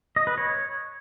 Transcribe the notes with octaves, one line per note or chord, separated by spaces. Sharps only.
D#5
B4
C#5